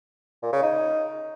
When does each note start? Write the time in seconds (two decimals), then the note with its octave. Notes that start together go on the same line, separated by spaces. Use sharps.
0.42 A#2
0.53 C#3
0.63 D#4